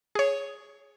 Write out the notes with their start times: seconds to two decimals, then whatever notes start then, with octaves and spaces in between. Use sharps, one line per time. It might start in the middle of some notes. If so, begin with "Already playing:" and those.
0.15 G#4 C#5